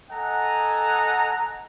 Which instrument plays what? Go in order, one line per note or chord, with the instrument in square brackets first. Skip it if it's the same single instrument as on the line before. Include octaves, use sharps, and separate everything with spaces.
[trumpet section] A4 D#5 F#5 G#5 A#5